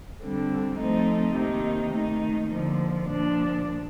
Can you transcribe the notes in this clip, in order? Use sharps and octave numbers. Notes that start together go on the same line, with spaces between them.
D3 G3 C4
F3 A3 C4 D#4
C3 D#3 A#3 D#4
D#3 A3 D#4
D3 F3 A#3
A#2 F3 A#3 D4